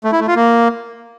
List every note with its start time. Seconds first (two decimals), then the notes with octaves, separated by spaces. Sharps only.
0.04 A3
0.12 E4
0.20 A3
0.28 F4
0.36 A#3